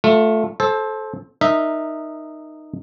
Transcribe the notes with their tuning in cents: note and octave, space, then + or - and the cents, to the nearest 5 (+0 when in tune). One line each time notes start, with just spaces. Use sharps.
A3 +0 F4 +25
A4 -20 C5 +15
D#4 -15 A#4 +0 E5 -15